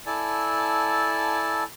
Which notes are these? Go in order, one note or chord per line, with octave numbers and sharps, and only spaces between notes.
E4 A4 D5 G#5 A5